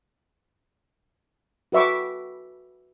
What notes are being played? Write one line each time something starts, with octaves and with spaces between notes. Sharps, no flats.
F#4 B4 E5 C#6 D6